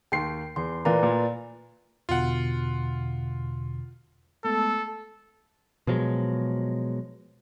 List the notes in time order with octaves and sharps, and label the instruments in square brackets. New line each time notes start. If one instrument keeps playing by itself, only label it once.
[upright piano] D#2 C6 C7 [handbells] G5
[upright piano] E2 [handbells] C6
[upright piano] A#2 E3 A#3 [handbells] B4 D5 A#5
[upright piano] A#2
[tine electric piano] E2 B2 D3 [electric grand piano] F4 F#5
[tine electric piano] G#3 A3 B3 [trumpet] A4
[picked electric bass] B2 F3 F#3 G#3